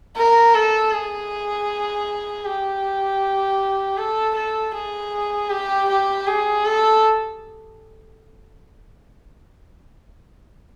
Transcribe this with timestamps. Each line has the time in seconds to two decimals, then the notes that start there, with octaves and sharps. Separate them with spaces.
0.17 A#4
0.54 A4
0.93 G#4
2.45 G4
3.97 A4
4.35 A4
4.74 G#4
5.50 G4
5.88 G4
6.27 G#4
6.65 A4